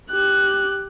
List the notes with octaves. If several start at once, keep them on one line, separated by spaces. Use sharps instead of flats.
G4 F#6